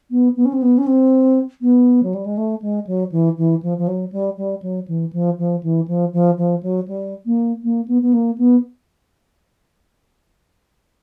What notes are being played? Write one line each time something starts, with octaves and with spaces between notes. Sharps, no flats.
B3
B3
C#4
C4
B3
C#4
C4
B3
F#3
G3
G#3
A3
G#3
F#3
E3
E3
F3
F3
F#3
G3
G3
F#3
E3
F3
F3
E3
F3
F3
F3
F#3
G3
A#3
A#3
B3
B3
A#3
B3